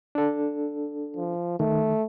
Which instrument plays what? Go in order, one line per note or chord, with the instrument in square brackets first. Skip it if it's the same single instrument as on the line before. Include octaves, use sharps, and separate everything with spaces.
[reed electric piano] D4 A4
[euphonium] F3
[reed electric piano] D#3 [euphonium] A3